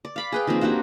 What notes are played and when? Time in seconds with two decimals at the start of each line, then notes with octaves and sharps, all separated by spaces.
0.05 D5
0.16 F5 B5 D6
0.32 G#4 B4 G5
0.47 D#3 F3 A#3 C4
0.61 A#3 D4 F#4 G4